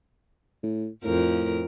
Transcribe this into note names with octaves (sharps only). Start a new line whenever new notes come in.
A2
F2 A2 A#4